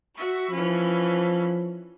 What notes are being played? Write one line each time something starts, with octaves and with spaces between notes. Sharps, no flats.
F#4 E5 C#6
E3 F3 C#4 B5